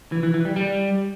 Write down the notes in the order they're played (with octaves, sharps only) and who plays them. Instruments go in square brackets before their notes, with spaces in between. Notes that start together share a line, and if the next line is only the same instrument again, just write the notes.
[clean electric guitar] E3
E3
E3
G3
G3